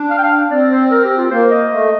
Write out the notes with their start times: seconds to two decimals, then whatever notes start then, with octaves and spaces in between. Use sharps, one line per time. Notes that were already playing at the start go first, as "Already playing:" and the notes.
Already playing: D4
0.10 F5
0.18 G5
0.23 F5
0.50 C4 D5
0.71 C5
0.91 A#4
1.04 G4
1.17 F4
1.31 A#3 C5
1.51 D#5
1.71 A3